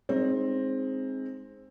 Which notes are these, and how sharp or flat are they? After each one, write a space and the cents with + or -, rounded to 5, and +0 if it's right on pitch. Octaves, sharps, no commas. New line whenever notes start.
G#3 +0 C4 +15 D#4 +0